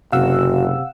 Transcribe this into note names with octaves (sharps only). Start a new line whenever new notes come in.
F#1 C3 F#4 F5 F#5 E6